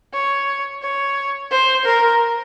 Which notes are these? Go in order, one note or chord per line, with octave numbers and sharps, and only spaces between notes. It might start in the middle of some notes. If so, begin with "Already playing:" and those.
C#5
C#5
C5
A#4